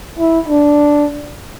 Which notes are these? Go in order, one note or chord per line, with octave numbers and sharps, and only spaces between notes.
E4
D4